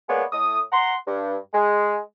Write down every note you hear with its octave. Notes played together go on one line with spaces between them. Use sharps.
G#3 A#3 B3 C#5 D5
A2 D#6
F#5 A#5 C6
G2
G#3